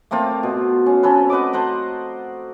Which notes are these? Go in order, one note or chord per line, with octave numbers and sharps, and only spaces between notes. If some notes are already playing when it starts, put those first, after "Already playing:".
A3 A#3 C4 F4
B2
C#4
C4 C#4 A4 B4
F#4 B4 D#5 D6
A4 C5 F#5 A#5